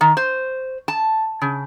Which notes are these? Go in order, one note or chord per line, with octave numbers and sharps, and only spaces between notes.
D#3
C5
A5
C#3